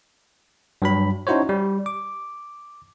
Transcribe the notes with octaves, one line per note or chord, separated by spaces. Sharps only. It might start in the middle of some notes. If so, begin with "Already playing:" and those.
G2 F#3 B5
C#4 D#4 E4 F#4 C5 C#5
G3
D6